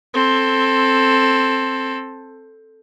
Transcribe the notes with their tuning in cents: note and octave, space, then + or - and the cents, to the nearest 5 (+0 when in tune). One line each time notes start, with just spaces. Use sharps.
C4 +10 A4 +5